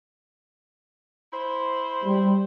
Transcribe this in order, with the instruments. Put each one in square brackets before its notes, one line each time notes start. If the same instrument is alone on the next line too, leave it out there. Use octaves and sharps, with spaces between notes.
[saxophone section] E4 C5
[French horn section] G3